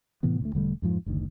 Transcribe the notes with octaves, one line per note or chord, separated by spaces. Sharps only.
A2 C3 E3 B3
D2 A3
E1 D3 G3 A3
F2 G#2 F3
F#1 D2 D#3